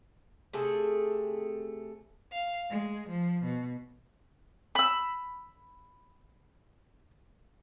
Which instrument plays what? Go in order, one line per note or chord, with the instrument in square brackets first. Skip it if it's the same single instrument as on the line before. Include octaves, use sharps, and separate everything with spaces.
[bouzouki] C3 A3 G#4 A4
[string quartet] F5
G#3
F3
B2
[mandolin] B5 E6